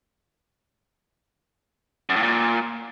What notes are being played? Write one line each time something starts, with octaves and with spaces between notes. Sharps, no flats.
F#2
A2
A#2